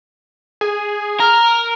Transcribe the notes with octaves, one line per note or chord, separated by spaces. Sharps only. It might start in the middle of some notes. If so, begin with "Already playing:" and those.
G#4
A#4 F6